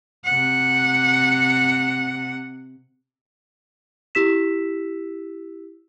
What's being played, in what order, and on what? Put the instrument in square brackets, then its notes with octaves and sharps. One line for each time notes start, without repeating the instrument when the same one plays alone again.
[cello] C3 F#5
[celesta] E4 G4 E6 B6 E7